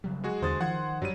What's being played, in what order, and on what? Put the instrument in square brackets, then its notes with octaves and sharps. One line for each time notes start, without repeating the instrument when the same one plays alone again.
[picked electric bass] C#3 F#3 G3
[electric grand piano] G#3 F#4 G#4
[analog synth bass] E2 [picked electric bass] D3 [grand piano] C5 D#6 A6
[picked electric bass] D#3 [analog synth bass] F3 [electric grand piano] F#5 C6 G#6
[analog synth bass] G2 [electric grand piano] F#3 G3 D#7